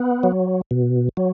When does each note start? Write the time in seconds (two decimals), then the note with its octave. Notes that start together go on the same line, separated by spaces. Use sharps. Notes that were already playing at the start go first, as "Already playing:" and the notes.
Already playing: B3
0.23 F#3
0.71 B2
1.17 F#3